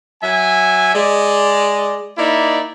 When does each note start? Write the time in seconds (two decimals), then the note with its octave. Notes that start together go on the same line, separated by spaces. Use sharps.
0.22 F#3 E5 G#5
0.95 G#3 D5
2.18 A#3 D#4 E4 D5